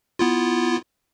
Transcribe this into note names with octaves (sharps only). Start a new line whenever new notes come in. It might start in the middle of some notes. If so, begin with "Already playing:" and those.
B3 E4 F4